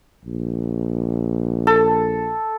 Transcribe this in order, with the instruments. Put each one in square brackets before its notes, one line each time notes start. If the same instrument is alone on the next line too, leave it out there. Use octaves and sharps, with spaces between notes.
[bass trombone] A#1
[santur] A4